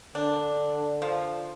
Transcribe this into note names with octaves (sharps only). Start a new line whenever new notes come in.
D3 D4
F3